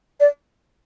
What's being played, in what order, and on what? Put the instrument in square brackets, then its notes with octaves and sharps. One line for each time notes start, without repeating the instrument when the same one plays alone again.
[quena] D5